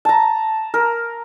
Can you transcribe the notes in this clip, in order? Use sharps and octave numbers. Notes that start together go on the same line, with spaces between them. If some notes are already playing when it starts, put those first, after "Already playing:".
A5 A#5
A#4